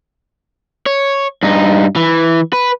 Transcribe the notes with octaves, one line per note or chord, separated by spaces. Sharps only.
C#5
G2 D#4
E3
B4